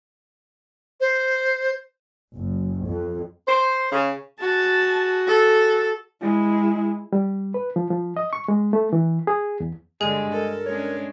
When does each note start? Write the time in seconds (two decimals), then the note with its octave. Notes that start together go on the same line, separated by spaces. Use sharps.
1.01 C5
2.36 F#1
2.86 F2
3.48 C5
3.92 C#3
4.41 F#4 G#4 A5
5.28 A4
6.21 G#3 E4
7.13 G3
7.54 B4
7.76 F3
7.91 F3
8.17 D#5
8.33 C#6
8.48 G#3
8.73 A3
8.93 E3
9.27 G#4
9.60 E2
10.01 G2 D3 G#3 G#4
10.32 A4 A#4
10.66 G#3 C#4 D4 C#5